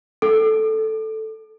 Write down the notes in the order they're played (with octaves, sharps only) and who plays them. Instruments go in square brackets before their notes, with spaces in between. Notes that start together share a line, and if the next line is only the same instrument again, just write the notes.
[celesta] A4